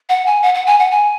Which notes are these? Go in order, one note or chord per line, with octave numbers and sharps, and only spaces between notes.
F#5
G#5
F#5
F#5
G#5
F#5
G#5